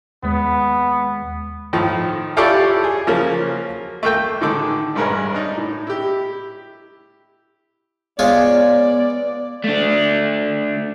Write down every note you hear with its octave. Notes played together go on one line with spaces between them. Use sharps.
D#2 G#3 B3
A2 D#3 F3
E4 F4 G4 A4 C#5 D5
G#4
C#3 F3 F#3 A#3
A3 A#3 G5
A2 D3 D#3 G#3 A4 D6
A1 G2 G#3 A#4 B4 C#5
D4 D#4
A2
E4 G4
G#3 B3 F4 C#5 D5
A3 D4